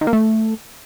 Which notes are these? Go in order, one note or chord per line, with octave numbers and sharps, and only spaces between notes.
D#3
A#3
A3